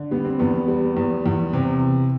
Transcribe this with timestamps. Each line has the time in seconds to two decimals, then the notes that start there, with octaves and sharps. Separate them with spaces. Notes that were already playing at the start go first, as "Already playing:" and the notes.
Already playing: D3
0.11 G3 B3
0.25 C4
0.39 E2 B3
0.68 G3
0.97 E2
1.26 E2
1.53 C3